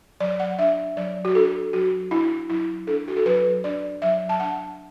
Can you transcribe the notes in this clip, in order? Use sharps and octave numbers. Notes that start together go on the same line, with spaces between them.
F#3 D5
F#5
D4 E5
F#3 D5
F#4
D4 A4
F#3 F#4
D4 E4
F#3 E4
D4 A4
F#4
A4
F#3 B4
D4 D5
F#3 E5
A5
D4 F#5